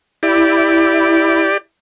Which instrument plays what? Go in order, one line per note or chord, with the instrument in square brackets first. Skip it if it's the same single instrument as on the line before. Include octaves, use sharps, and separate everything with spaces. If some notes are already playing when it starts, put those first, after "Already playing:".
[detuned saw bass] E4 [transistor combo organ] G4 D5